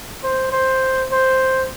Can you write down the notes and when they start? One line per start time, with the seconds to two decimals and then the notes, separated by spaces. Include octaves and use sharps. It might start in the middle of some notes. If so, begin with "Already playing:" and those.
0.23 C5
0.52 C5
1.12 C5